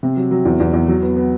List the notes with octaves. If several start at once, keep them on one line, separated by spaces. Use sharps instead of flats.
C3
F#3
F#3
E2
E2
E2
F#3
B3
B3